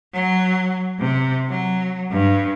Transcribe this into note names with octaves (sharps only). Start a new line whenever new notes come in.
F#3
C3
F#3
G2